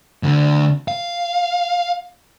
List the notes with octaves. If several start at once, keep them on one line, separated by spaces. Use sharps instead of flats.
D2 D3
F5